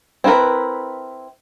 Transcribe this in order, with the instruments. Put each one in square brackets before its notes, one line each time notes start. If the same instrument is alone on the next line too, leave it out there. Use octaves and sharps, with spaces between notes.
[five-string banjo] C4 E4 F#4 A#4 B4